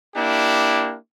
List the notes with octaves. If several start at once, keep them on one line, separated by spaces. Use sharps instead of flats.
A#3 D4 E4 G4